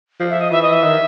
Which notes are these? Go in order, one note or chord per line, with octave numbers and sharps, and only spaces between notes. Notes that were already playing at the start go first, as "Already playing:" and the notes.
F3
E5
D#5
E3 E5
D#5
E5
D#3